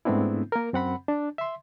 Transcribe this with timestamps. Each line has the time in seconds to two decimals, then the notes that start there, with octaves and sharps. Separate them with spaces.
0.05 G#2 A3 B3 C4 D4 E4
0.52 A#3 A#4
0.73 F#2 C4 F#5 B5
1.08 D4
1.38 E5 C6